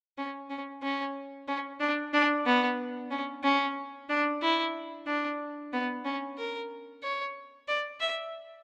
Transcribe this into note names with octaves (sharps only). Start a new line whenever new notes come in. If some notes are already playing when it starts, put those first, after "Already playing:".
C#4
C#4
C#4
C#4
D4
D4
B3
C#4
C#4
D4
E4
D4
B3
C#4
A#4
C#5
D5
E5